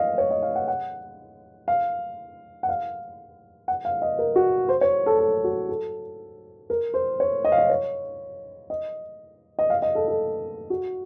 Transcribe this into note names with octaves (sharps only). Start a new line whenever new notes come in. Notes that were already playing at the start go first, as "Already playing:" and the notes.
Already playing: D#5 F5
C#5
D#5
F5
F#5
F#5
F5
F#5
F5
F#5
F5
D#5
A#4
F#4
C5
C#5
A4
A4
F#4
A4
A#4
C5
C#5
D#5
F5
D#5
C#5
D#5
D#5
F5
D#5
A4
A4
F#4